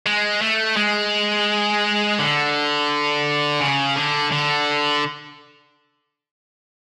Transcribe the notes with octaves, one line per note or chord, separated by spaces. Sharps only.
G#3
A3
G#3
D3
C#3
D3
D3